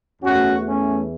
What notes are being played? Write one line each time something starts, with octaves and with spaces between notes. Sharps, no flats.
E2 E3 A3 C#4 F#4
A3 C#4